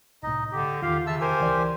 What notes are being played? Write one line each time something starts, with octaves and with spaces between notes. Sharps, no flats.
C2 A2 D#4 D#5
D3 G4
E2 D#3 F4 G4 F5
C#3 E5 A5 E6
G4 A#4 C5 G#5
C#2 E3 D5